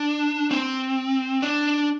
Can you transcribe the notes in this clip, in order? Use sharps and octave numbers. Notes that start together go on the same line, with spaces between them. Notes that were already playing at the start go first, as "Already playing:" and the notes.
Already playing: D4
C4
D4